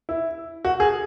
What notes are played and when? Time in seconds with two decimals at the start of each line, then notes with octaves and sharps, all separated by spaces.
0.09 E4
0.65 F#4
0.80 G#4